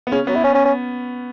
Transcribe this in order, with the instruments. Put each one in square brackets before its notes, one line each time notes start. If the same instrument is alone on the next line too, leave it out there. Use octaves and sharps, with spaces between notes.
[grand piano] B3
[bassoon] C#3 [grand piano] C#4
[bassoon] F#3 [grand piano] B3
[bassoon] E4
C#4
C#4
C#4